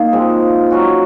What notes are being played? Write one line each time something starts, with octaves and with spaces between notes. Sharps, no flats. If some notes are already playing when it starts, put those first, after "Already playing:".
Already playing: A#3 D#4
G#2 F3 G#3 C4
F#3 C#4 F#4